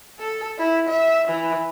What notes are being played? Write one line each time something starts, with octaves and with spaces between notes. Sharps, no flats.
A4
E4
E5
E3